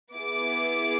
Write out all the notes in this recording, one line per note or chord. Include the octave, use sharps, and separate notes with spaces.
B3 E4 G#4 D6